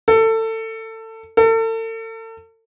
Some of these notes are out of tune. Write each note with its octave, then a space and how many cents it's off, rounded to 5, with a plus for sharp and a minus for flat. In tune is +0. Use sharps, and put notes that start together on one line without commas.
A4 +25
A4 +40